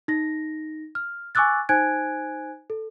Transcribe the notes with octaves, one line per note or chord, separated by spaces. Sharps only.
D#4 A#6
F6
G#5 C#6 D6 E6 F#6 A6
D#4 C5 G#5 F#6 G#6 D7
A4